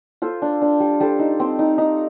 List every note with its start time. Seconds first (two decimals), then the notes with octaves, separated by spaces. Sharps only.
0.22 F4 A4 C5
0.42 D4
0.62 D4
0.80 G3
1.00 G3 A4 C5
1.19 D#4
1.40 C4
1.59 D#4
1.78 D#4